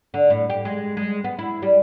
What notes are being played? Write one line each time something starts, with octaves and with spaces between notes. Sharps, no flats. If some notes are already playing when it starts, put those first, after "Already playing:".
D3
A2
G4
G#3
G#3
B3
E4
G3